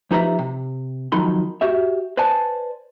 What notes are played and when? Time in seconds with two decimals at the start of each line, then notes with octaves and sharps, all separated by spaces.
0.11 F3 D#4 G4 B4 E5 A#5
0.39 C3
1.12 F2 D#3 F#3 D#4 B5 C6
1.61 F#4 G4 C#5 E5
2.17 B4 C5 D5 G#5 A5